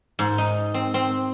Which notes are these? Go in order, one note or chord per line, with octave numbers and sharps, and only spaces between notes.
G#2
D#4
C4
C4